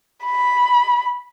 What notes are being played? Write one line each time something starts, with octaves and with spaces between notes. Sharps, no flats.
B5